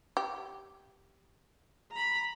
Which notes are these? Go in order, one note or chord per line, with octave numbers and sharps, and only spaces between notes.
G4
A#5 B5